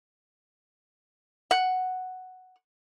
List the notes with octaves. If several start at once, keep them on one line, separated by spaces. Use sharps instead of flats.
F#5